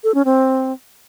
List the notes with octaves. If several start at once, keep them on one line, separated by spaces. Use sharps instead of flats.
A4
C#4
C4